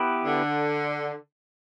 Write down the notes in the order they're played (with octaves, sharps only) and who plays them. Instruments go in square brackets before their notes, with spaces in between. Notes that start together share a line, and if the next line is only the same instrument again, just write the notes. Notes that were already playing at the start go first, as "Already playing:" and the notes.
Already playing: [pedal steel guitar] B3 E4 G4 B4
[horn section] D3